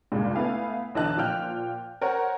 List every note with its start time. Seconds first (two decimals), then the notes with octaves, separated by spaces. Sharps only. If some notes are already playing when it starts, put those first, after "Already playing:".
0.12 C#2 G2 A#2 G#3
0.35 A3 B3 E4 F5 G#5
0.95 B1 D3 E3 D#5 A5 F#6
1.17 A#2 F3 F4 G5 F6 G6
2.02 A#4 C5 C#5 F#5